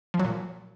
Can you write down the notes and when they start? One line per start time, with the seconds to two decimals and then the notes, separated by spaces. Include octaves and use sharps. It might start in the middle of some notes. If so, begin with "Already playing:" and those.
0.14 F3
0.19 F#3
0.25 A#2